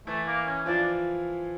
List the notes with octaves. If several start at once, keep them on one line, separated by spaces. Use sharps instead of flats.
E3 A3 E4
A#3
C#4
F3 D4 F4